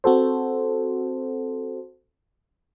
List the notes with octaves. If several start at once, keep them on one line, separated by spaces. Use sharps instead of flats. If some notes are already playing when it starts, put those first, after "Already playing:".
C4 F#4 A4 C5